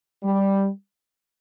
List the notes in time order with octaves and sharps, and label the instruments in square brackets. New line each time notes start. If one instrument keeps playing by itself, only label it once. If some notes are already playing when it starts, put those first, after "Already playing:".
[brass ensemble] G3